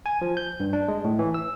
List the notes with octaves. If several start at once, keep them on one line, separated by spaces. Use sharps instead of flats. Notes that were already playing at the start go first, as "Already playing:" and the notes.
G#5
F3
G6
G2
D4
G#3
A2
E3
E6